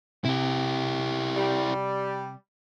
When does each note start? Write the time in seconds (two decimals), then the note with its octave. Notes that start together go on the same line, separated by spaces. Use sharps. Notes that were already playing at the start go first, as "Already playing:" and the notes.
0.25 C3 E4 G4
1.36 G3